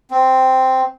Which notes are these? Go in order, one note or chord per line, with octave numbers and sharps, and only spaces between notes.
C4